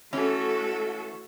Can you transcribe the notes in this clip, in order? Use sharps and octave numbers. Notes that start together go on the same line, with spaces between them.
E3 A3 C#4 F#4 A4